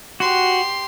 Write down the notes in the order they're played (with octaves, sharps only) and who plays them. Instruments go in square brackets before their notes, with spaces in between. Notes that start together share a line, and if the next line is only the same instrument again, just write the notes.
[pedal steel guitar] F#4 [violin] G4 C6